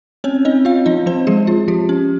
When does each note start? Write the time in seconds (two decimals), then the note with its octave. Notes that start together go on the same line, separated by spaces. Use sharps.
0.24 C4 C#4 C#5
0.45 C4 D#4 D#5
0.65 C4 F4 F5
0.86 F3 D#4 D#5
1.06 F3 C4 C5
1.27 F3 G#3 G#4
1.47 F3 F4
1.68 F3 G4
1.89 C#4